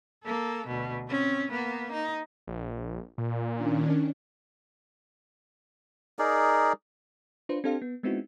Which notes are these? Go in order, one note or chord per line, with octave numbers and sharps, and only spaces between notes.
A#3 A4
D2 B2
C4 C#4
A#3 B3
D#4
A#1
A#2
D#3 C#4 D4
D#4 G#4 A#4 D5
D4 F4 B4 C5
C4 D4 G4 A4 C5 F5
B3
G#3 B3 C4 D#4 E4 F#4